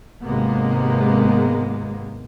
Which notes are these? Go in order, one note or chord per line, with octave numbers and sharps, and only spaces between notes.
G#1 C3 G#3 A#3 B3